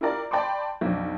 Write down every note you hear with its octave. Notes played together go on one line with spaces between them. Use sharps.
E4 F4 G4 A#4 D5
D5 G5 A5 B5 C6 D6
B1 F2 D4